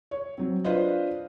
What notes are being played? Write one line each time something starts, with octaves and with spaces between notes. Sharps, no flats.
C#5
F#3 C4
D4 F4 B4 C5 D#5